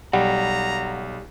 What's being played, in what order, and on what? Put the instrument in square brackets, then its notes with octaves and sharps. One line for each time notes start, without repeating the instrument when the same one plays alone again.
[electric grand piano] B1 [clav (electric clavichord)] G3 [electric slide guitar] F#5 [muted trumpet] A#5